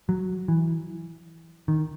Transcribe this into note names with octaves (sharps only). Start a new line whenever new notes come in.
F#3
E3
D#3